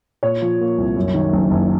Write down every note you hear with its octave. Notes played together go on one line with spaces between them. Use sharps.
A#2 C#5
F3
A#3
C2
F#2
D#3
F#1
F#1